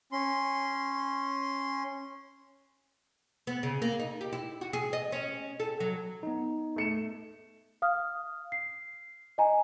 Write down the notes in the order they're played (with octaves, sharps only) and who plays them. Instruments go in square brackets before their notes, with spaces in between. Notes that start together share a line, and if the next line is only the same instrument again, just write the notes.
[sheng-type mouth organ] C#4 C6
[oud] B3
C#3
A#3
D#4
G4
E4
F#4
G#4
D#5
C#4
A4
F#3
[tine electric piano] B3 D#4
[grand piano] A3 C#7 E7
[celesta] F5 D#6 F6
C7
D#5 G#5 A#5